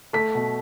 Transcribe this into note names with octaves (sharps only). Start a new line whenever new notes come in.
A3 B6
B2